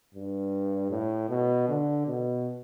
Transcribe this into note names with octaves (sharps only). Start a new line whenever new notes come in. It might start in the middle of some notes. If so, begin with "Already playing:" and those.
G2
A2
B2
D3
B2